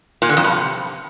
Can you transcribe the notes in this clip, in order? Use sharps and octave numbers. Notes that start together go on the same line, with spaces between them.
A#2
D3
F2
G2
C3